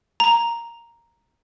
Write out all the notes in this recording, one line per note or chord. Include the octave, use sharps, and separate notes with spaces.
A#5